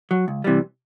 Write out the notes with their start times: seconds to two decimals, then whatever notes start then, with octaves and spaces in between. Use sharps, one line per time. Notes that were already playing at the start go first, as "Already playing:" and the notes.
0.11 F#3
0.28 C#2
0.44 C3 E3 G3